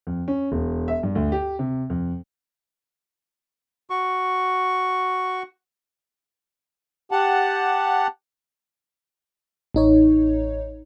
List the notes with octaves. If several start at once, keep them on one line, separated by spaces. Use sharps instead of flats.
F2
C#4
E1
E5
G2
D2
G4
C3
F2
F#4 C#6
G4 F#5 A5
A1 D#4 C#5